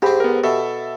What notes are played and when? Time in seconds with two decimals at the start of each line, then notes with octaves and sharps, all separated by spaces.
0.02 G#2 C4 G4 B5
0.20 B3 A#4
0.44 B2 A4 E5